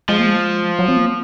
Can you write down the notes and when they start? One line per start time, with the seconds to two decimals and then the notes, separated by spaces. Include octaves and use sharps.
0.09 F3 G#3
0.19 A#3
0.26 G#3
0.79 F#3
0.88 C4
0.97 A#3